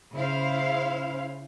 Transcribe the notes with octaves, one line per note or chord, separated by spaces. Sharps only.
C#3 E4 C5 F5